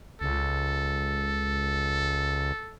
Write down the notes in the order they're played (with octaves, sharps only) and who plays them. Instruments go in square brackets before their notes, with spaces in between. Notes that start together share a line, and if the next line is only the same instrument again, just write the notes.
[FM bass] C#2 [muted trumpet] A4